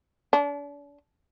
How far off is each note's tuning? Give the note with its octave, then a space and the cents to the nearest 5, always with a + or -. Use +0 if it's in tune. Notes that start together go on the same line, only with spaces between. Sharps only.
D4 -40